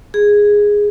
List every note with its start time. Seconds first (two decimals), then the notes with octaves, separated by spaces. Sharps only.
0.14 G#4